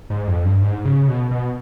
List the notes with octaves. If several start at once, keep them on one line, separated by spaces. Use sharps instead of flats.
G#2
F2
G2
G#2
C#3
B2
B2